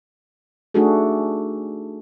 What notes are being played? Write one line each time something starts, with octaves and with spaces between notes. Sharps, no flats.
A3 D4 D#4 F#4 G#4 A4